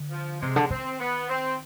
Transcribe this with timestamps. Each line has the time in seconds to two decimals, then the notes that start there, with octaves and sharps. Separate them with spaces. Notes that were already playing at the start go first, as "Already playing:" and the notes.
Already playing: D3
0.11 F3
0.40 C3 G#3
0.56 D3
0.70 D#3 C4
1.00 B3
1.29 C4